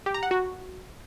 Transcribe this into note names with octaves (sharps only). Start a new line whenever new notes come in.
G4
A#5
F#5
F#4